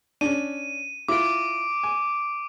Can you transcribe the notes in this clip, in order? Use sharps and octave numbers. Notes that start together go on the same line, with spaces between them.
C#4 D4 D#7
E4 F4 D6 D7
G#5